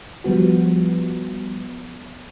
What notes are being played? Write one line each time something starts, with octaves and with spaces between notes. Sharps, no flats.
F3 G3 B3 F#4